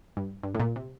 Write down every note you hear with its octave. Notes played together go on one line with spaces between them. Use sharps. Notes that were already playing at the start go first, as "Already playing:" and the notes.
G2
G2
A2
A#2
C3